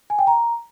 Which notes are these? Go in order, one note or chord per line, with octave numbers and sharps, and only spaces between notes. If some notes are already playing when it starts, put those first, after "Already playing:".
G#5
G5
A#5